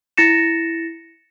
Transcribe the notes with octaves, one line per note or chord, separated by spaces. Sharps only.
E4 A6 A#6 C#7 E7